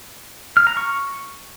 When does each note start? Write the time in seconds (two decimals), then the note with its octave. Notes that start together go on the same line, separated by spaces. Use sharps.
0.57 F6
0.67 A#5
0.77 C#6